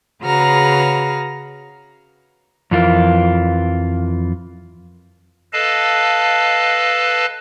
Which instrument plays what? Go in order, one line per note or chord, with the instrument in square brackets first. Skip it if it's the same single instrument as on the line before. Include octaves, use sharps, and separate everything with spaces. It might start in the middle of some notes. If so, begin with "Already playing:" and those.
[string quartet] C#3 F#4 G#4 B4 A#5 F6
[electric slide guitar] F2 E3 F4 A#4
[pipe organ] A4 B4 D#5 F5 A5